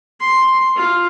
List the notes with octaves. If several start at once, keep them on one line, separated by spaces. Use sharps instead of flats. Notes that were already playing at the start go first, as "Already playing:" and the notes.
C6
F4